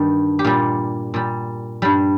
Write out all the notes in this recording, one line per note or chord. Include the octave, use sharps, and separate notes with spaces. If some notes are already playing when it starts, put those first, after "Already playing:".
Already playing: G2 D#3 G3
G4
A#2 G3 F4
A#2 G3
G2 G3